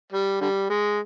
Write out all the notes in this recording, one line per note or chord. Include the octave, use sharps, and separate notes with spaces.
G3
D3 G3
G#3